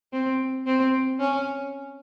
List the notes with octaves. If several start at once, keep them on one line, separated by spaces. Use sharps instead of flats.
C4
C4
C#4